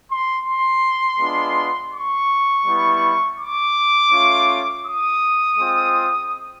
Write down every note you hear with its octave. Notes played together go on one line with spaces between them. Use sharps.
C6
C6
G#3 B3 D4 F4
C#6
G3 B3 E4
D6
A3 C#4 F4
D#6
G#3 C4 F4